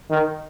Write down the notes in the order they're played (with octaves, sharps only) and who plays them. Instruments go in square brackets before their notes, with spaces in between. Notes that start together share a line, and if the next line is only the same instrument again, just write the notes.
[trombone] D#3